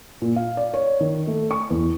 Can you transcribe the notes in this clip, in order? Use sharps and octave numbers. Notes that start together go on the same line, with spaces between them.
A#2
F5
D5
C#5
D#3
A3
C#6
E2